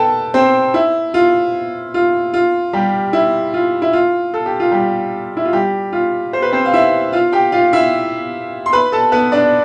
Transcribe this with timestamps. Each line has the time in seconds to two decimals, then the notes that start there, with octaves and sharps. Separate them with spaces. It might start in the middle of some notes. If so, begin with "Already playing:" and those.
Already playing: A4 B4 G5 A5
0.34 C4 C5
0.74 E4
1.14 F4
1.94 F4
2.34 F4
2.73 G3 G4
3.13 E4
3.54 F4
3.82 E4
3.93 F4
4.34 A4
4.46 G4
4.60 F4
4.72 G3 G4
5.37 E4
5.45 F4
5.53 G3 G4
5.92 F4
6.33 C5
6.42 B4
6.52 C4 C5
6.65 F5
6.74 E4 E5
7.12 F4 F5
7.32 G4 G5
7.52 F4 F5
7.73 E4 E5
8.66 C6
8.73 B4 B5
8.92 A4 A5
9.12 B3 B4
9.32 D4 D5